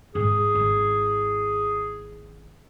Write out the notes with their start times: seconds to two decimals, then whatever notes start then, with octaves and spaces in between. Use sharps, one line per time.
0.15 G#2 G#4
0.55 G#1 E4